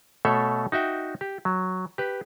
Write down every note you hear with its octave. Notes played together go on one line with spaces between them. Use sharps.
B2 A3 A4 C#5 E5
D#4 F#4 E5 G5
G4
F#3
G4 B4